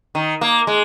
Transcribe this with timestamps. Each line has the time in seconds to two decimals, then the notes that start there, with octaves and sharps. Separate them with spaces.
0.15 D#3
0.41 A#3
0.67 G#3